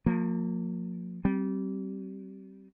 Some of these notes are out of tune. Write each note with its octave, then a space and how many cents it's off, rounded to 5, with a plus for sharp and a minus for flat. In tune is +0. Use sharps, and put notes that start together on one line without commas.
F3 +35 A#3 -20
G3 -25 C4 +15